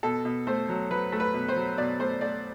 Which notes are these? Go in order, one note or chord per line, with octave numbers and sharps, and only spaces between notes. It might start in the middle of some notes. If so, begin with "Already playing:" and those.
B2 A4
B2
A3 C5
F#3
F#3 B4
A3
B4
B2
C5
F#3
B2 D5
A3 C5
A3 D5